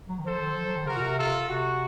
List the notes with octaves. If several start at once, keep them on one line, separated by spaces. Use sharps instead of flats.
F#3
D#3
F3 A4 C5
D#3
F3
F#3
D#3
C#3 F#4 A#4
A#2
C3
F4 A4
C3 F#4